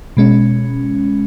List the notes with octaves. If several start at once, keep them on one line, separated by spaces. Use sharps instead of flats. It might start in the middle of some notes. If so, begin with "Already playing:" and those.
B2 G#3 C#4